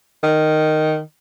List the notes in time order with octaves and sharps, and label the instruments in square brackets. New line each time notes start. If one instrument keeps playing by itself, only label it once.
[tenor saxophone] D#3